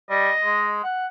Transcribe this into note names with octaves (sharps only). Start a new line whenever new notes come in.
G3 D#5
G#3
F#5